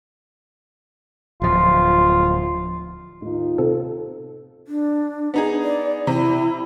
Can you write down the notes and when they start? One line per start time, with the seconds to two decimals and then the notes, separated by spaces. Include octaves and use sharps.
1.42 D1 F3 F4
3.22 D#2 A2 D#4 F4
3.58 C3 C4 A4
4.67 D4
5.34 B3 D#4 G#4
5.62 D5
6.07 C3 E4